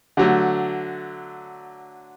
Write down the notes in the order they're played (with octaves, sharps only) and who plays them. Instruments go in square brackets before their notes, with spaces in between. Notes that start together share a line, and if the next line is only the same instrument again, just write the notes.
[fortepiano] D3 F#3 A3